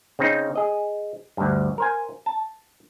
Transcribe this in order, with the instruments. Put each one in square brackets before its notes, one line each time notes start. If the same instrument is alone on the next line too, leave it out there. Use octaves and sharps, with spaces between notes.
[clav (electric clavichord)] C#3 C4 D#4
G#4 D#5
D2 G2
A#4 C5 G#5
A5